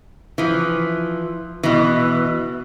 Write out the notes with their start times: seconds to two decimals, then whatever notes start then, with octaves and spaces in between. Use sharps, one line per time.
0.38 E3 F3
1.63 B2 E3